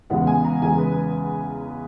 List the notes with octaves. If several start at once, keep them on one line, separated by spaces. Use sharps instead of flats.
E2 C#3 G#3 B3 F#5
G#5
A#5
E2 C#3 G#3 G#5
B4